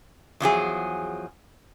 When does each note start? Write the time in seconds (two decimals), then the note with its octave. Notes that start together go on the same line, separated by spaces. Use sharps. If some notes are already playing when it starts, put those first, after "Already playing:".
0.40 E2 F3 F#3 G#4